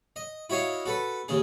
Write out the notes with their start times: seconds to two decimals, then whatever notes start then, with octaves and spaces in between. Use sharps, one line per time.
0.16 D#5
0.50 E4 F#4 C#5 D#5 F5
0.86 F#4 A4 B4
1.28 D#2 C#3 G#4